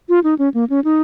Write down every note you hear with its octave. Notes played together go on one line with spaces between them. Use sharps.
F4
D#4
C#4
A#3
C#4
D#4